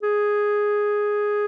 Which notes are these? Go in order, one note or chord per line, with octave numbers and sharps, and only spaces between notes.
G#4